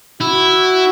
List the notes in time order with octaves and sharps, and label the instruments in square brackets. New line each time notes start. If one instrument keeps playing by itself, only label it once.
[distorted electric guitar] E4 [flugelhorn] F#4